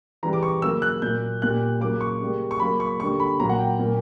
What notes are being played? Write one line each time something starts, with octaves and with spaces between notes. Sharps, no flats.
C#3 E3 G3 A#5
D6
C#6
C#3 F#3 A#3 E6
F#6
A#2 F#3 A#3 G6
A#2 G3 A#3 F#6
C#3 F#3 A#3 D6
C#6
C#3 G3 A#3
C#6
C#3 F#3 A#3 B5
C#6
D3 G3 A#3 C#6
B5
A#2 F#3 A#3 A#5
F#5
G5
A#2 F#3 A#3